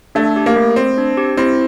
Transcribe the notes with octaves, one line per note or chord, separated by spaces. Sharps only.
A3 D4
G4
A#3
A3
A3 C4
D4
G4
C4 E4